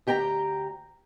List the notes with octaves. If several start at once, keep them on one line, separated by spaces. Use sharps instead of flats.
D2 G4 G5 A5 A#5